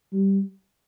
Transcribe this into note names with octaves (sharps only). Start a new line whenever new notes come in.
G3